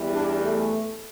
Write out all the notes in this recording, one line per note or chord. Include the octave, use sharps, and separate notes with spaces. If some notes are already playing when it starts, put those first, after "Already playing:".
Already playing: E2 E3 G3
D4
A3